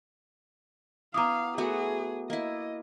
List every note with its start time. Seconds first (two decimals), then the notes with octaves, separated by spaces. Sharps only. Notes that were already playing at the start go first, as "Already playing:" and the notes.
1.14 B3 E4 F5 A#5 D6 D#6
1.58 A3 B3 F#4 G#4
2.30 A#3 E4 D#5